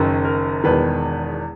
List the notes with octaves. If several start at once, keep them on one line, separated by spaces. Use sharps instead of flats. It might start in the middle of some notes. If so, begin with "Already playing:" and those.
Already playing: F#1 F#2 D#3
A#4
E1 E2 D#3 B4